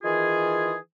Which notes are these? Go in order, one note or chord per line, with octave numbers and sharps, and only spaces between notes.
D#3 E3 F4 G#4